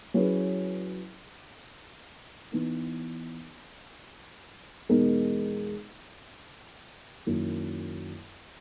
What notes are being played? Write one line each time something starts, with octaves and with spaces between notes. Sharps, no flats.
F#3 C#4 E4 G#4 B4
E3 B3 D#4
E2 B2 G#3 D#4 A#4
F#2 D#3 A#3 E4